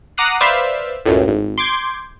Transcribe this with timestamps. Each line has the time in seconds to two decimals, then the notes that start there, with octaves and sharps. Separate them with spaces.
0.18 F#5 A#5 D6 D#6 F#6 C7
0.40 B4 C5 D5 E5 F5 E6
1.06 C#2 F#2 A2
1.28 G#1
1.58 C6 D6 G6 G#6